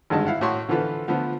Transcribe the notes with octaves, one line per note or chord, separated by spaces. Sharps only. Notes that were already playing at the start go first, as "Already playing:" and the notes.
G#1 G2 D3 G#3 D#5 A5
E4 F5 F#5
A2 F#4 C#5 C6
D3 E3 F3 F4 A4 B4
D3 F3 A3 B3 F4